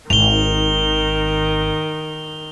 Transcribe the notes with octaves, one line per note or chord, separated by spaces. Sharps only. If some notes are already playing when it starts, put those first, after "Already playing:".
G#1 D#3 F7 G7